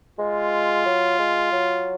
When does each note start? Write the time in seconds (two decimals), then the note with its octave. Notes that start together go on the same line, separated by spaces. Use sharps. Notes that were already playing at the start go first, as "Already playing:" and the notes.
0.19 G#3 F4
0.85 F#3
1.19 G#3
1.52 F#3